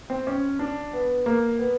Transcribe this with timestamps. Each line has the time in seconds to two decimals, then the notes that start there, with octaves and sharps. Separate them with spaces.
0.10 C4
0.27 C#4
0.59 D4
0.93 B3
1.26 A#3
1.59 B3